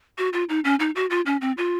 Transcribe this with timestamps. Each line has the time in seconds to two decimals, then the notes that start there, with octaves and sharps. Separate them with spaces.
0.18 F#4
0.33 F4
0.49 D#4
0.65 C#4
0.80 D#4
0.96 F#4
1.10 F4
1.26 C#4
1.41 C4
1.57 F4